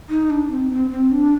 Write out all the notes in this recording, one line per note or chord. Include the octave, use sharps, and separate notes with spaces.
D#4
D4
C4
C4
C4
D4